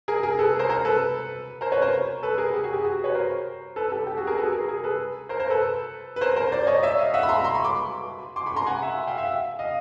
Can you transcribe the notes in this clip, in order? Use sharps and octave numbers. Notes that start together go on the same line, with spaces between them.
G#4 A#4
G#4 A#4
A4 B4
A#4 C5
A#4 C5
A4 B4
A#4 C5
B4 C#5
A#4 C5
A4 B4
G#4 A#4
G4
F#4 G#4
G4
F#4 G#4
B4 C#5
A#4 C5
A4 B4
G4 A4
G4 A4
F#4 G#4
G#4 A#4
A4 B4
G#4 A#4
G#4 A#4
A4 B4
A#4 C5
A#4 C5
A4 B4
B4
A#4 C5
A#4 C5
C5 D5
C#5 D#5
D5 E5
D#5 F5
E5 F#5
B5
A#5 C6
A#5 C6
B5 C#6
C6 D6
C6 D6
B5 C#6
A#5 C6
F#5 G#5
E5 F#5
F5 G5
E5 F#5
D#5 F5